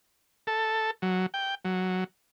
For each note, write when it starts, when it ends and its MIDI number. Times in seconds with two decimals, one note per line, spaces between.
0.47 0.91 69
1.02 1.26 54
1.34 1.55 79
1.65 2.04 54